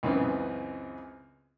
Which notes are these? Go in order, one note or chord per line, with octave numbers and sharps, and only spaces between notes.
C#2 F#2 C#3 E3 B3 C4